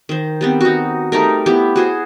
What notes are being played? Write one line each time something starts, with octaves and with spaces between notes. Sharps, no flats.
D#3 C5
G3 B3 C4
D#4 F#4
G3 A3 D#4 A#4
B3 E4 G4
F#4 G#4 C5